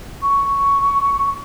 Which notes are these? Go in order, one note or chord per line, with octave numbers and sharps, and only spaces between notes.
C#6